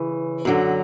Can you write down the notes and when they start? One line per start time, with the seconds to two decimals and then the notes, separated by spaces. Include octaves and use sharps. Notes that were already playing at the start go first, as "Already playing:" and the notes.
Already playing: C#3 E3
0.45 F#2 D3 F#3